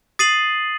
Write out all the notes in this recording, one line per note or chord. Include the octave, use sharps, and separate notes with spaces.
D#6 A6 C7 D#7 F#7